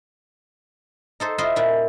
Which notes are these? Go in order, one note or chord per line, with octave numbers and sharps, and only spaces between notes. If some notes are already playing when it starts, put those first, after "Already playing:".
D#4 A4 C5
E4 F4 C5 D#5
A#2 E4